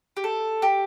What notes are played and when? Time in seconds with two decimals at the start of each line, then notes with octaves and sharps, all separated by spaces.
0.17 G4
0.24 A4
0.62 G4